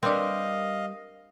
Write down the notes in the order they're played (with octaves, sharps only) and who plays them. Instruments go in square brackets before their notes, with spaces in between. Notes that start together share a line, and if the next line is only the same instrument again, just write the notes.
[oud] G3 A#4 B4 [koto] C4 D4 [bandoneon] D#5 F5